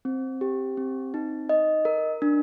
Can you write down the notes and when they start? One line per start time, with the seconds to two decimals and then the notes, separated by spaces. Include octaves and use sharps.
0.05 C4
0.41 G4
0.77 C4
1.14 D#4
1.49 D#5
1.85 A#4
2.22 D4